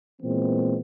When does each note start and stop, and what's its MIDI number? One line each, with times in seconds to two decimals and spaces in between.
0.22 0.78 46
0.22 0.78 52
0.22 0.78 56
0.22 0.78 59
0.22 0.78 60